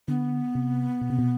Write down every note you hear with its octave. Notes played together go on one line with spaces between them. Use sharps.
D3 B3
C3
B2
C3
B2